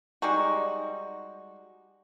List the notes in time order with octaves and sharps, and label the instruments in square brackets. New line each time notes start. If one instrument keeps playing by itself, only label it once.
[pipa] G3 G#3 D#4 F#4